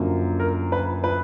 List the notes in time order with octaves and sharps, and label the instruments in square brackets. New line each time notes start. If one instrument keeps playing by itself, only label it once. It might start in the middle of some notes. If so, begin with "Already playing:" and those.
Already playing: [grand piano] F#2 D3 F3 A#3
A#4
B4
B4